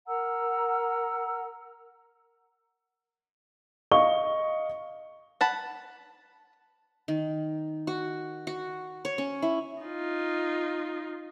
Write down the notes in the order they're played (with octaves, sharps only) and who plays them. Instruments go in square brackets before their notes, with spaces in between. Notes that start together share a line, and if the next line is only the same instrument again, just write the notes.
[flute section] A#4 F#5 A#5 E6
[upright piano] D#5 F5 C#6 G7
[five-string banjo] F#5 A5 B5
[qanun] D#3
F#4
F#4
C#5
C#4
E4
[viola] D#4 F4